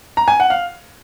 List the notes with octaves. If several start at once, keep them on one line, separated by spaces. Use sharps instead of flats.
A#5
G#5
F#5
F5